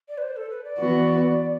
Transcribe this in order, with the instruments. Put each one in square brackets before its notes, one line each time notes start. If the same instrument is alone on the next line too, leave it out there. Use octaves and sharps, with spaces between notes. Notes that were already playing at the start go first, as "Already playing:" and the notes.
[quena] D5
B4
C5
A4
B4
D5
[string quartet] E3 B3 F#4